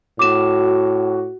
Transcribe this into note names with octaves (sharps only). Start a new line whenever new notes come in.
A2 F#4 D6 E7